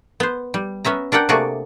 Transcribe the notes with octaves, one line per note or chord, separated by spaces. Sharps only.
B3 C5
G3
B3 C#4 E5 A#5
D4 A#4 D5 F#5 G5
C3 A3 A#3 F#4 G#4 D5